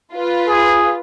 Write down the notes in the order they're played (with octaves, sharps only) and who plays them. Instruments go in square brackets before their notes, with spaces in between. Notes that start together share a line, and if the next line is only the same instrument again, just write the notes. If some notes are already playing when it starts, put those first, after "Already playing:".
[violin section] F4 B4
[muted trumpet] G#4